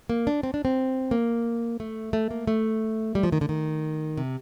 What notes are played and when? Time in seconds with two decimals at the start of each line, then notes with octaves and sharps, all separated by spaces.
0.09 A#3
0.27 D4
0.43 C4
0.54 D4
0.65 C4
1.11 A#3
1.80 A3
2.13 A3
2.31 A#3
2.47 A3
3.15 G3
3.23 F3
3.32 D#3
3.41 D3
3.49 D#3
4.17 C3